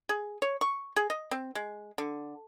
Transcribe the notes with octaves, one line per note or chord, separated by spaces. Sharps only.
G#4
C#5
C#6
G#4
D#5
C4
G#3
D3